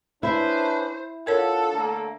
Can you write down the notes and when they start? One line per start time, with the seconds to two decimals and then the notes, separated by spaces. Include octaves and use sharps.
0.23 C#4 D4 E4 B4 C5 E5
1.27 D4 F4 A4 A#4 C#5 F#5
1.73 D3 A3 A#3